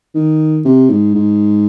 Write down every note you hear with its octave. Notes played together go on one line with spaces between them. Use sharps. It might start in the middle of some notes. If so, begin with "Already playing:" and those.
D#3
C3
G#2
G#2